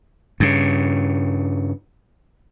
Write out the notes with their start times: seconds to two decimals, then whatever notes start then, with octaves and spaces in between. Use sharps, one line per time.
0.40 G2 C#3